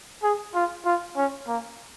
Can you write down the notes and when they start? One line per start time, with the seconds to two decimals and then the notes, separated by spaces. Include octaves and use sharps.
0.23 G#4
0.55 F4
0.85 F4
1.17 C#4
1.48 A#3